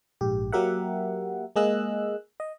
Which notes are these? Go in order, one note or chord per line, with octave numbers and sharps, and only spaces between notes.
A#1 G#2 G4
F#3 A#3 G4 A#4 E5 F#5
G#3 A#3 G#4 D#5 E6 F#6
D#5